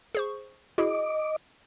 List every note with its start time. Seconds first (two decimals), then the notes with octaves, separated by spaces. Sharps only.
0.15 G#4 C5 C#6
0.78 E4 F#4 G#4 D#5 D6